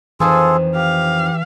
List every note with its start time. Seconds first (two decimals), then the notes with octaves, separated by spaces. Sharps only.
0.20 F2 D#3 E3 C4 F4 G#4 A4
0.75 G4 F5